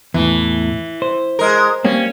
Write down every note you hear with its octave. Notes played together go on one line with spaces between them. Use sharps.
E2 A2 E3
C5
G#3 A#4
G3 A#3 C4 C#4